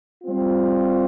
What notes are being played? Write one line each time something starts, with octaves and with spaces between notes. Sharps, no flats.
G3 C4 F4